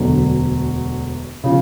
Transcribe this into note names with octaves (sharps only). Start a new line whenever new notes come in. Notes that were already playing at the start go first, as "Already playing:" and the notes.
Already playing: E1 D2 D3 F#3
C#3 F3